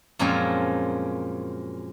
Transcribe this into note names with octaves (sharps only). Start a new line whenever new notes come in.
F#2 A#2 F3 G#3 C4 C#4